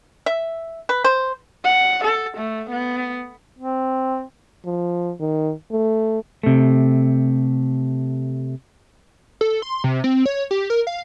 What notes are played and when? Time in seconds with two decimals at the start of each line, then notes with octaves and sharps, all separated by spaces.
0.26 E5
0.89 B4
1.04 C5
1.65 F#5
2.04 A4
2.37 A3
2.70 B3
3.59 C4
4.65 F3
5.20 D#3
5.71 A3
6.43 C3 A3
9.41 A4
9.62 C6
9.84 C3
10.04 C4
10.26 C#5
10.51 G4
10.70 A#4
10.87 F5